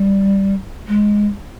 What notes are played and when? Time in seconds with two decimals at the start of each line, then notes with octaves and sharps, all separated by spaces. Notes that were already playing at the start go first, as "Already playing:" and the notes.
Already playing: G3
0.87 G#3